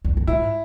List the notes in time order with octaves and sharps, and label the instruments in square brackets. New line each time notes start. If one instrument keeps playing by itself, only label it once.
[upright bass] E2
F#2
[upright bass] G#2 [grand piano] E4